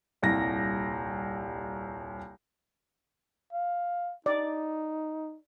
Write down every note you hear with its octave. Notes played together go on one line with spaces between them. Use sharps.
D#1 C2 A#6
F5
D#4 D5